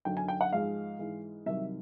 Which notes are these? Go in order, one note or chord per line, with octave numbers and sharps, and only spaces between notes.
F#2 D3 F#3 G5
G#5
G5
F#5
G#2 F3 G#3 F5
G#2 E3 G#3
C2 C3 D#3 F#3 E5